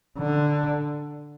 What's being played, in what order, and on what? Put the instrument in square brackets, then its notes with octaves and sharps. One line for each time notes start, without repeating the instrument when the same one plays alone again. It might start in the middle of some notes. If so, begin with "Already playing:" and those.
[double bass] D3